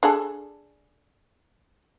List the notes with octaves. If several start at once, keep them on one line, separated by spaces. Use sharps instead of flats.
D4 G#4 A4